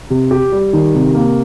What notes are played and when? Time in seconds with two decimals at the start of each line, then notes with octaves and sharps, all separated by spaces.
0.10 C3
0.31 G4
0.52 G3
0.73 D#3
0.95 C3
1.15 A#3